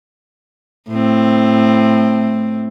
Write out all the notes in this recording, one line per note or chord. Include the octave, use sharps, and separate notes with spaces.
A2 C4